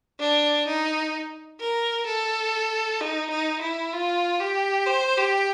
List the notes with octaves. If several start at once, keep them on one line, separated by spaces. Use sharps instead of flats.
D4
D#4
A#4
A4
D#4
D#4
E4
F4
G4
C5
G4